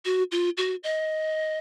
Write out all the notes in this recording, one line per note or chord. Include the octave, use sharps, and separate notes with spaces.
F#4
F4
F#4
D#5